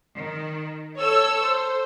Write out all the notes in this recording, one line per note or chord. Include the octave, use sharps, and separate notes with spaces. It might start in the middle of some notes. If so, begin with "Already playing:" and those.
D#3
A4 C#5 E6
C5